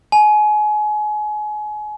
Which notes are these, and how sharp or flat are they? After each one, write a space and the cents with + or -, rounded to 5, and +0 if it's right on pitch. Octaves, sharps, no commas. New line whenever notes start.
G#5 +30